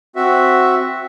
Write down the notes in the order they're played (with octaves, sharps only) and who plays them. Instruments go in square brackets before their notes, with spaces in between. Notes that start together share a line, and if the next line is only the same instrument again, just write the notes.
[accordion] C4 F#4 E5